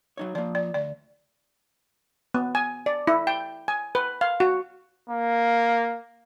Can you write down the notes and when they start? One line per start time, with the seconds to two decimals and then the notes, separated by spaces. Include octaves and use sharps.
0.17 F#3 D#4 C#5
0.35 F3 A#3 D5
0.55 D5
0.74 D2 D5
2.34 B3
2.55 G#5
2.86 D5
3.07 E4
3.27 G5
3.68 G#5
3.95 B4
4.21 F5
4.40 F#4
5.10 A#3